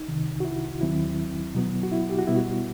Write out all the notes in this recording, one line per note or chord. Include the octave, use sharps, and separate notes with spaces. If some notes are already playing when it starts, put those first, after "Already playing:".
Already playing: D#4
C2 C3 D#3
F#4
E4
D#2 D#3 F#3 C4 E4
B2 F#3 B3
F#4
E4
G4
F#4
B2 G3 B3 E4
F#4